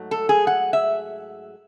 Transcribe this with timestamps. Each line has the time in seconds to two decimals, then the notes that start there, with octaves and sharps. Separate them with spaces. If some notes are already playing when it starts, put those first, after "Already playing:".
Already playing: G#2 F#3 A3
0.11 A4
0.29 G#4
0.47 F#5
0.73 E5